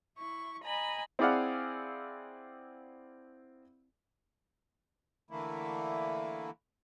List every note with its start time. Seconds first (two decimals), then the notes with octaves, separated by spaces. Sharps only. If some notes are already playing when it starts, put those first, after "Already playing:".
0.17 E4 C#6
0.64 D#5 G#5 A#5 B5
1.19 C4 E4 G#4 D5 F5 F#5
5.31 D3 E3 A3 A#3 E4